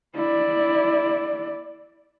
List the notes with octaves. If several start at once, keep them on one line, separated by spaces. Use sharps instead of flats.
E4 D5